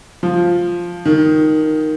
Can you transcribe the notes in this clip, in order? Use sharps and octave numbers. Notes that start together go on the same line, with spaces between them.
F3
D#3